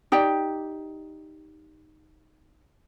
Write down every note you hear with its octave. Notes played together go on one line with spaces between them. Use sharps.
D#4 G4 D5 G5